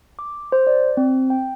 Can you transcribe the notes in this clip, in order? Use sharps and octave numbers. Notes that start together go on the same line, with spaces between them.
D6
C5
D5
C4
G5